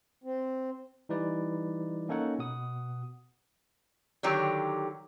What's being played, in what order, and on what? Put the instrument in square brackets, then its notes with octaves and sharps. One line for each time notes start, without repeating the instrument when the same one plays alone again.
[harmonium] C4
[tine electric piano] E3 G3 D#4 E4 B4 D5
A#3 C#4 D#4 A4 C#5 F#5
B2 F#5 D#6
[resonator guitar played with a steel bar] D3 D#3 F#3 G4